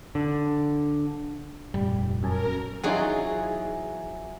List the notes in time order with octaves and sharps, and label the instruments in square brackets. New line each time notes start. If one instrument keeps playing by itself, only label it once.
[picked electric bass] D3
[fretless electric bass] F1 G3 [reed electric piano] G2 A#2
[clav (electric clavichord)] F#2 G#5 A5 [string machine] A#4
[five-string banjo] E3 D#4 F4 [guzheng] F#3 G#4 [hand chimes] E5 G#5